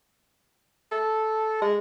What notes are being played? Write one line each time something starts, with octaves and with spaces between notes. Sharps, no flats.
A4
G#3